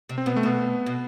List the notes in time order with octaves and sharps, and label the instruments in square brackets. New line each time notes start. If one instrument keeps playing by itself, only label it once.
[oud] C3
[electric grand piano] C4
[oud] B2 [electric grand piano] B3
[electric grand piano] A3
[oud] B2 [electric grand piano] B3
[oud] B2